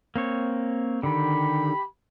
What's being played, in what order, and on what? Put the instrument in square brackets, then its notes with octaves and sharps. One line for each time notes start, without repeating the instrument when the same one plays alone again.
[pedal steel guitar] A#3 C4 C#5
[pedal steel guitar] D3 D#3 [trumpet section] G4 B5